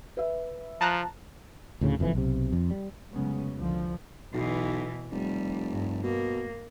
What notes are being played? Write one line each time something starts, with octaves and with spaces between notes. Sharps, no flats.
B4 E5
F3 A5 A#5 F#6
D2 A2 C#3
F#1 F2 B2 E3
B1 C3
F2
G3
F1 C#3 F#3 G#3 B3 C#4
C2 D3 F3
B1 B2 E3
F1 G3
G2
B2 A#3